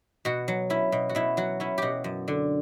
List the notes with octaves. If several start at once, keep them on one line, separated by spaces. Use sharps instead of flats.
B2 F#4
F#3
C#4 E4
B2
F#4
B2 E4
F#3 F#4
C#4 E4
B2 F#4 G4
F#2
D3